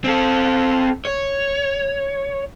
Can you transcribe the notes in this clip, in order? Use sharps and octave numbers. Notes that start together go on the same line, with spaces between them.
C4 A4
C#5